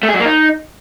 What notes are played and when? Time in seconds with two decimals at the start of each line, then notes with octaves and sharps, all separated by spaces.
0.03 A3
0.09 G#4
0.14 F#3
0.20 A#3
0.25 D#4